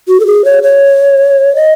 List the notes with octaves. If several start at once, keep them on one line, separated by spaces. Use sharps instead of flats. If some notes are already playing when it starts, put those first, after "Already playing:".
F#4
A4
G#4
C#5
C#5
D#5